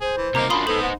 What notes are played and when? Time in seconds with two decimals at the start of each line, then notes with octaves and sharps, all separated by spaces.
0.01 G#4 C5
0.17 E3
0.35 C2 A#3 D#4 A#5 D6
0.50 F#2 D4 F4 B5 C6 D#6
0.67 B3 D#4 A4 C5 F#7
0.83 F#5